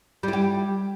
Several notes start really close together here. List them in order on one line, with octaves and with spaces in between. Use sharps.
G3 E4 G4